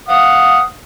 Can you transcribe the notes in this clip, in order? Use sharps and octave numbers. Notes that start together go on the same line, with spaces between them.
F5 F#5 D#6